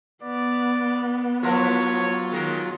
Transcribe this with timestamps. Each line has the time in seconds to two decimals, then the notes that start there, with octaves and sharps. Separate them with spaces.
0.23 B3 D5
1.43 F3 F#3 E4 F4 A#4 C#5
2.32 D#3 G#3 A#4